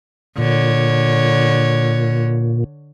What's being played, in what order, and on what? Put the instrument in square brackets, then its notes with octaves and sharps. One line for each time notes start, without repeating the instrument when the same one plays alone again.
[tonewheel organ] A#2 [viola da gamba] D3 C#5